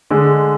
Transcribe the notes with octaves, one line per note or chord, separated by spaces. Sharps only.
D3 G#3